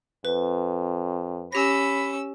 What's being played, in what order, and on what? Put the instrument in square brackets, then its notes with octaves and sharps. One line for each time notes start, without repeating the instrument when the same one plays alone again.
[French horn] F2 [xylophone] B4
[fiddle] C#4 E6 [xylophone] G4 A#6 [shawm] B5